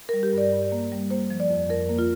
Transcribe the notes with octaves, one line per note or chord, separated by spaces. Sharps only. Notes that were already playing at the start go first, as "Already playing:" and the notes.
A#4
G3
G4
G2 D5
G2
A#3
G3
A#3 C5
F3
D5
F2
F2 A#4
A#3
F4